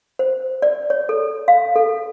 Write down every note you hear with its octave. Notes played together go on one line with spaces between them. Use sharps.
C5
D5
C#5
A4
F5
A4